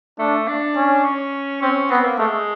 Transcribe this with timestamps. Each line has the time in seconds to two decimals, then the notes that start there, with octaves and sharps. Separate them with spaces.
0.19 A3 D4
0.48 D4
0.77 C#4
1.05 C#4
1.62 C4 C#4
1.91 B3 C4
2.05 A#3
2.19 G#3 A3